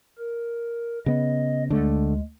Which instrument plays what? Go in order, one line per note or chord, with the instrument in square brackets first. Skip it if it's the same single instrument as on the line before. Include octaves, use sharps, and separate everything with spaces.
[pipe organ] A#4
[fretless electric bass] C#3 B3 [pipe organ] D#5
[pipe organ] D2 G#3 [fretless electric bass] D3 A3